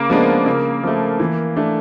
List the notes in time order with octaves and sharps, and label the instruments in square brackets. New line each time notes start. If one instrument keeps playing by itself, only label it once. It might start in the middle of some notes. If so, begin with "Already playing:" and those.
Already playing: [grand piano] C#3 [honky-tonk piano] A#3
[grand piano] F3 G#3 B3 D4
C#3
F3 A3
E3
A3 D4